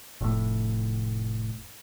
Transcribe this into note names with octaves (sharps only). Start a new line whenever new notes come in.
F1 A2